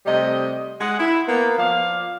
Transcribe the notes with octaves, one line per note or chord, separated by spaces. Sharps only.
C3 G3 A3 D#5
G#3 F#5
E4
A#3 B3
F3 D5 F5